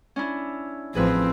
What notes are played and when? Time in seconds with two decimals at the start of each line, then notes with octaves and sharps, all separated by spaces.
0.16 C#4 D4 E4
0.95 A1 F3 C4 G#4 B4 E6